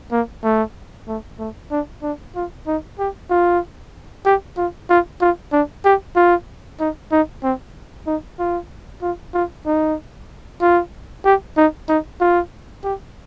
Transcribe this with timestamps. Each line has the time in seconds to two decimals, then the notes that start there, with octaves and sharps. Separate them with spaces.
0.12 A#3
0.44 A3
1.08 A3
1.39 A3
1.71 D4
2.03 D4
2.36 F4
2.67 D#4
2.99 G4
3.31 F4
4.26 G4
4.57 F4
4.90 F4
5.21 F4
5.53 D4
5.85 G4
6.16 F4
6.80 D#4
7.12 D#4
7.44 C4
8.07 D#4
8.39 F4
9.02 F4
9.34 F4
9.66 D#4
10.62 F4
11.25 G4
11.57 D#4
11.89 D#4
12.21 F4
12.84 G4